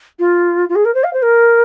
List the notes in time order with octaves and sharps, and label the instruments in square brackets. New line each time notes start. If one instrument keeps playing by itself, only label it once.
[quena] F4
F4
G#4
A#4
C5
F5
C5
A#4